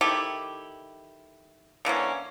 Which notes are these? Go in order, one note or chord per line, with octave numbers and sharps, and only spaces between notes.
D#3 A3 E4 G4
D3 E3 A#3 C#4